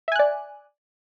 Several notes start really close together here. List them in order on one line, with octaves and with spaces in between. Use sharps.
E5 G#5 F#6 D5